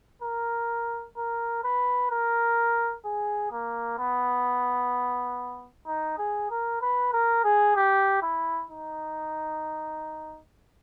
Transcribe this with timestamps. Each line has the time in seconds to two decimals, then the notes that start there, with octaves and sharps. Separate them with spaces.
0.22 A#4
1.17 A#4
1.64 B4
2.11 A#4
3.05 G#4
3.52 A#3
3.99 B3
5.87 D#4
6.18 G#4
6.51 A#4
6.82 B4
7.13 A#4
7.44 G#4
7.76 G4
8.23 E4
8.70 D#4